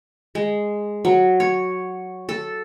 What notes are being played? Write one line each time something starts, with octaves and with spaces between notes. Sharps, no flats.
G#3
F#3
C#5
A4